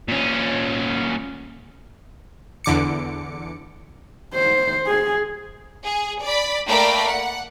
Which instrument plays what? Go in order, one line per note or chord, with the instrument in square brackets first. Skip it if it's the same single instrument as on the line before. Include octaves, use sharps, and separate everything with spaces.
[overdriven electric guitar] A#2 C#4
[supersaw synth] E2 D3 D6 C#7
[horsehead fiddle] C5
G#4
[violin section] G#4
D5 B5
A3 A#3 A#4 D5 G5 B5
F#5